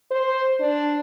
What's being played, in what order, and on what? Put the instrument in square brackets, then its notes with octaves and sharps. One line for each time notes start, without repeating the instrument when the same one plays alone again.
[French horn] C5
D4